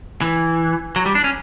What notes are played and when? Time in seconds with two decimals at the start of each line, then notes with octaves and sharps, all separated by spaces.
0.21 E3
0.96 F#3
1.06 G3
1.15 D4
1.24 C#4